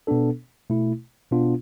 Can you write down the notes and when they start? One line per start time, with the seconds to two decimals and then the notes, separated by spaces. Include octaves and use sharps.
0.07 B2 B3 D4 A4
0.70 B2 A3 E4
1.31 B2 B3 D4 F4